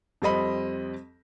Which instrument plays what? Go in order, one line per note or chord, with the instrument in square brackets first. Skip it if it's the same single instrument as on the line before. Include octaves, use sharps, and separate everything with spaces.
[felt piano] F2 G3 C4 D#5 B5